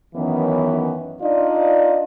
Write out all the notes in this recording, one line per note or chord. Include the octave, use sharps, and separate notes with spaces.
F#2 D#3 E3 B3 C#4
D4 D#4 F4 D5 D#5